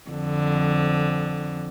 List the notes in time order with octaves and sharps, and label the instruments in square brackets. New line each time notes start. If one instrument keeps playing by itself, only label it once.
[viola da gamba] F2 D3